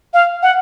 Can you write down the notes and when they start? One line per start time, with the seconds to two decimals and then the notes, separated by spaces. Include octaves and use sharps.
0.14 F5
0.43 F#5